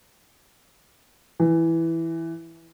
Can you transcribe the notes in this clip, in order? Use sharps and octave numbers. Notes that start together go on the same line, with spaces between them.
E3